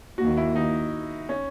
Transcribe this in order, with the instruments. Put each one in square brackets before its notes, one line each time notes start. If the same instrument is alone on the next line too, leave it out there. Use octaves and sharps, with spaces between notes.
[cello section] D#2 D#3 A#3 [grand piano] F#4
[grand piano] E4
D#4
C#4